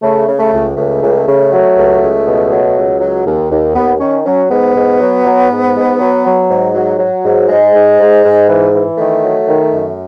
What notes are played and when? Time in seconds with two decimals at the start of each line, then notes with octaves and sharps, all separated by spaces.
0.02 C#3 A3
0.26 C#3
0.39 A3
0.52 C#2
0.77 C#2 A3
1.01 C#2
1.27 C#3
1.52 F#3
1.76 C#2
2.02 C#2
2.26 B2
2.51 F#3
2.76 C#2
3.00 F#3
3.26 D#2
3.51 D#2
3.75 D#2 B3
4.00 D#3 C#4
4.25 F#3 C#4
4.51 G#2 B3
4.75 G#2
5.00 F#3
5.25 F#3
5.50 G#2
5.75 G#2
5.99 F#3
6.24 F#3
6.49 G#2
6.74 F#3
6.99 F#3
7.24 G#2
7.48 G#2 G#3
7.74 G#2
7.99 G#2
8.23 G#2
8.49 E3
8.74 E3
8.98 D#3 A3
9.23 F#3
9.48 D#3
9.72 F#2